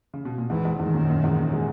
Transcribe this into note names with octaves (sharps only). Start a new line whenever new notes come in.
C#3
B2
A#2
E2 G#2 E3
E2 G#2
E2 G#2 D#3
F#2 A#2
F#2 A#2
E2 G#2
F#2 A#2
E3 G#3